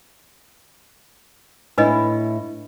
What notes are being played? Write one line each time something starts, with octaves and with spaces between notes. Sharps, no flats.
A2 D4 E4 B4 D#5